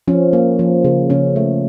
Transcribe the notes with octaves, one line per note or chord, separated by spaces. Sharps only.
F3 C#4
A#3
F3
C#3
C#3 C#4
A3